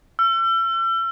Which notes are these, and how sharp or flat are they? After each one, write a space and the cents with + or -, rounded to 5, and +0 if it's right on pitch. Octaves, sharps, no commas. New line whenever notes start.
E6 +40